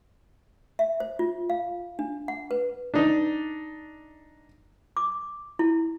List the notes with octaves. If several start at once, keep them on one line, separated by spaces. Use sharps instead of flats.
E5
C5
F4
F5
D4
F#5
B4
D4 D#4
D6
E4